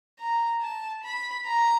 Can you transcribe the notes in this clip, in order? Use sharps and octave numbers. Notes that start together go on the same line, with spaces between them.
A#5
A5
B5
A#5